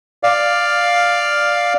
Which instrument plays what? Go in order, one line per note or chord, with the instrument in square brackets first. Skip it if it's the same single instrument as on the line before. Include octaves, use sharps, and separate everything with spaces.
[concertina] D5 F5